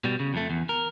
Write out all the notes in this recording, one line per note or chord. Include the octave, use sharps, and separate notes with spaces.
B2 G3
C#3
F2 A3
E2
A#4